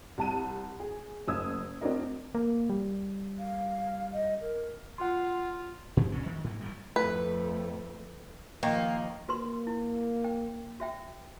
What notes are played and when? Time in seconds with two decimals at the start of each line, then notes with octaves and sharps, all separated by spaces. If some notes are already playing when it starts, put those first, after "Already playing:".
0.18 C2 A5 D#7
0.80 G#4
1.28 F#1 D#6 E6 G#6
1.81 C4 D4 F#4 A#4 D#5
2.35 A#3
2.70 G3
3.39 F5
4.13 D#5
4.41 A#4
4.98 F4 F#5 C6
5.97 F#2 A#2
6.12 C#2 A#2 C#4
6.26 D2 D#3
6.44 G#2 F#3 A#3
6.61 D#1 D#2 A2 G3
6.96 F2 A3 B4
8.63 D#3 F3 A#3
9.29 A#3 F#4 B4 C6
9.67 E4
10.24 G5
10.80 F#4 E5 G5